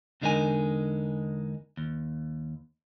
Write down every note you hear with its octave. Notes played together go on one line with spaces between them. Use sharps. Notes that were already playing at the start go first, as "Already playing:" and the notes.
E2 D3 G#3 D#4 A#4 G#5
D#2